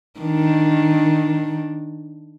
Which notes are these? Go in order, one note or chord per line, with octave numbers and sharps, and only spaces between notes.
D#3 D4